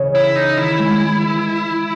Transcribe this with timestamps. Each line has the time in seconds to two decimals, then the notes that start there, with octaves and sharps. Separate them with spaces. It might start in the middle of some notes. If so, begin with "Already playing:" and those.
Already playing: C#3 E3
0.15 E4
0.36 D#4
0.57 D#3 E4
0.79 G#3
1.00 G#3
1.22 E3